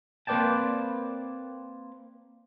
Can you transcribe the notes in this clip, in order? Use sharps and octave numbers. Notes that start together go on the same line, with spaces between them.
A#3 C4 B4 D5 G5 A5